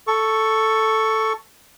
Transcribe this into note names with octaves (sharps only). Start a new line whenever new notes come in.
A4 C#6